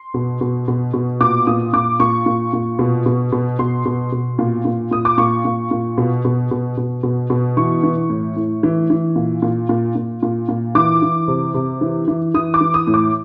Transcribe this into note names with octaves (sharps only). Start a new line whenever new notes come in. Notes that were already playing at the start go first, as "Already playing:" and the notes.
Already playing: C6
B2
B2
B2
B2
A#2 D6
A#2 D#6
A#2 D6
A#2 C#6
A#2
A#2
B2
B2
B2
B2 C6
B2
B2
A#2
A#2
A#2 D#6
D6
A#2 C#6
A#2
A#2
B2
B2
B2
B2
B2
B2
E3 C#6
E3
A2
A2
E3
E3
A#2
A#2
A#2
A#2
A#2
A#2
E3 D6
E3
C3
C3
E3
E3
E3 D#6
D6
E3
D#6
A2
D6